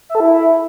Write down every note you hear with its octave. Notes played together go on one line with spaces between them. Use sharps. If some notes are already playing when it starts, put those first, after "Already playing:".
E5
A4
E4